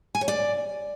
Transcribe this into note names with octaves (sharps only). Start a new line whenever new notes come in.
G#5
C#5
D5